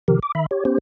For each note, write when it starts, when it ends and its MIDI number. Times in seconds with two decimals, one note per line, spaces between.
0.08 0.19 48
0.08 0.19 51
0.08 0.19 53
0.08 0.19 67
0.08 0.19 70
0.23 0.32 86
0.35 0.46 51
0.35 0.46 76
0.35 0.46 83
0.51 0.64 67
0.51 0.64 73
0.65 0.78 59
0.65 0.78 61
0.65 0.78 67
0.65 0.78 72